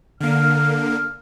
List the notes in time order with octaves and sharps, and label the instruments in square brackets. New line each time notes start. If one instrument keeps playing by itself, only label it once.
[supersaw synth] D3 A#3 [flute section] F6